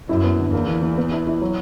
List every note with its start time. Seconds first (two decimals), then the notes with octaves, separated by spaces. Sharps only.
0.09 F#2 E4
0.24 B3
0.39 D3
0.53 E2 A#3
0.67 E3
0.82 E3
0.98 B3
1.12 E4
1.27 E4
1.41 F#3